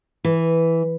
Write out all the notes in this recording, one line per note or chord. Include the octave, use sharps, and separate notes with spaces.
E3